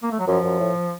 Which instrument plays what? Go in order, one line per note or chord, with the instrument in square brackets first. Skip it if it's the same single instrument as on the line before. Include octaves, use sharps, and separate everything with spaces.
[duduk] A#3
A3
F#3
[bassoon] F#2 [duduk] F3
[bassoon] F#2
A2